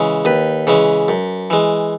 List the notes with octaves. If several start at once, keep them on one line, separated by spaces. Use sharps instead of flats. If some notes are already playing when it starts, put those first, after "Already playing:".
Already playing: C#3 E3 G#3
D#2 B4
C#3 E3 G#3
F#2
E3 G#3